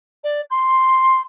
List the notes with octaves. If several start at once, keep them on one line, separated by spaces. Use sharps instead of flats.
D5
C6